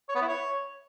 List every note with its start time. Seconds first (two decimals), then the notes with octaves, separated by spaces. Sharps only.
0.09 C#5
0.15 B3
0.21 E4
0.28 C#5